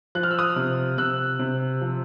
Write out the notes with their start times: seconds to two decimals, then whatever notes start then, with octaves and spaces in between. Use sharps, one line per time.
0.15 F3 F#6
0.23 F6
0.31 E6
0.39 D#6 F6
0.56 C3
0.98 C3 E6 F#6
1.39 C3
1.81 F3